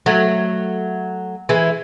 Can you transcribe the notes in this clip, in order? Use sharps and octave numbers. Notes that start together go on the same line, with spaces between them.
F#3 A3
E3 G#3